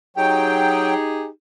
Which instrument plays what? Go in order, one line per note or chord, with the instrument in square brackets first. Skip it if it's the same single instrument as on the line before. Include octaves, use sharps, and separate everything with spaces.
[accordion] F#3 G5 [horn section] D#4 G4 G#4